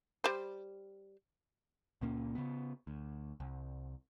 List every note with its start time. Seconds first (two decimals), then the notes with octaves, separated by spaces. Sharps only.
0.24 G3 C5
2.01 C#2 A#2 A#3 C#4
2.35 C#3 B3
2.87 D2
3.40 C2